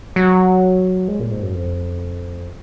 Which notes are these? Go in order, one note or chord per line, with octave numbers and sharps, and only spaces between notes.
F#3
G#3
A#2
G#2
F#2
F2